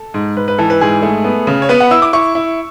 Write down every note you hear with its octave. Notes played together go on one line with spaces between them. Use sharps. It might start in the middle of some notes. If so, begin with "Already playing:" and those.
Already playing: A4
G#2
G#2 B4
B4
E3 A4
B4
G#2 G#4
A3
B3
C#3
C#5
B3 B4
F#5
E4 E6
D6
E4 C#6
E4